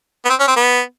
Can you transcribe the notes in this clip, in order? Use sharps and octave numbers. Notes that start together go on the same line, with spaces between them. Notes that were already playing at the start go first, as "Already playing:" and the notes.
B3
C4
C#4
C4
B3